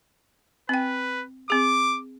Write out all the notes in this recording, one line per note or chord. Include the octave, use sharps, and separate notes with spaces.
C4 B4 G5
C4 G#4 D6